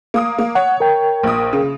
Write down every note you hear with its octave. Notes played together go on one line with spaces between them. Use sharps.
A#3 D#6
A#3
C#5 F#5
A#4 G5
A#1 D#6
C#3